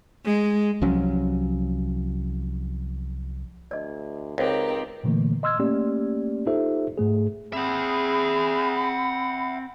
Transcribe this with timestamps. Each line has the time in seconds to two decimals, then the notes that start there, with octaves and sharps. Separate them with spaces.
0.25 G#3
0.81 C2 F3 F#3 C#4
3.71 D2 D5 D#5
4.38 C#2 C4 D#4 G4 A#4 C5 D5
5.04 A#2 D3 E3 A3 A#3
5.43 D#5 C6 E6 F6 G#6
5.59 A3 A#3 C#4 G4 D5
6.47 D#4 F4 G4 A4 C5 E5
6.98 G#2 A3 G#4
7.53 C4 G#4 E5 F#5 B5